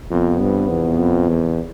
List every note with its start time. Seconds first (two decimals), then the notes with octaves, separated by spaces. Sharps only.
0.10 F2 C3 F3 B3
0.40 G2
0.69 E2
0.99 F2
1.29 E2